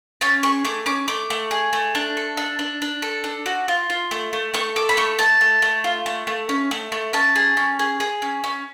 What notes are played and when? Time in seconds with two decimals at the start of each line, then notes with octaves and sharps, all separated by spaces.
0.21 C#4 A5
0.43 G#4 C#6
0.65 A3 D6
0.86 C#4 D6
1.08 A3 D6
1.30 A3
1.51 G#4
1.73 A3
1.95 D4
2.17 A4
2.37 D4
2.59 D4
2.82 D4
3.02 A4
3.24 D4
3.46 F#4
3.68 F4
3.90 F4
4.11 A3
4.33 A3
4.54 A3 C#6
4.76 A4 D6
4.89 B5
4.97 A3 C#6
5.19 A3 A5
5.41 A3
5.62 A3
5.84 F4
6.06 A3
6.27 A3
6.49 C#4
6.71 A3
6.92 A3
7.13 C#4 A5
7.36 G#4
7.57 C#4
7.79 G#4
8.00 G#4
8.22 C#4
8.44 C#4